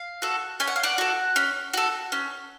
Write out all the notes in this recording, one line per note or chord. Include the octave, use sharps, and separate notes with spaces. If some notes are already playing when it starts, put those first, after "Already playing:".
Already playing: F5
F#4 A4
C#4 G#5
F#5
F5
D5 F#5
F#4 A4
C#4
F#4 A4
C#4